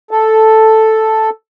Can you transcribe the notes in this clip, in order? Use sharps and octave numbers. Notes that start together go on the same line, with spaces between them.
A4